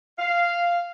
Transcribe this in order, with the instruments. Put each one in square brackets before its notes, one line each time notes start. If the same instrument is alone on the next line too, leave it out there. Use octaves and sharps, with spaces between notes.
[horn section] F5